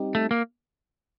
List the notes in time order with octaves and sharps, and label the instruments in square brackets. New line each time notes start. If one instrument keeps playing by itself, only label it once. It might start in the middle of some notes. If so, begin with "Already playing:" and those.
Already playing: [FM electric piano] G3 C4 D#4 G4
[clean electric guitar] A3
A#3